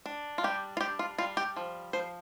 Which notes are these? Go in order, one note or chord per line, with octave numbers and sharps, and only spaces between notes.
D4
F4
G3 G4
F4
D4 G4
F4
G3 F4
G4
F3
F3 C5